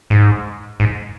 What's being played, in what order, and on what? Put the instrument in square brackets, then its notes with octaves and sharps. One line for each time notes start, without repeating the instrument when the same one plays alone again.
[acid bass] G#2
G#2